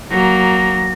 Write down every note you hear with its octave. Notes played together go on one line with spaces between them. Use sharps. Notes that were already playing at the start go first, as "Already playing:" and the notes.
F#3 A#3 A#6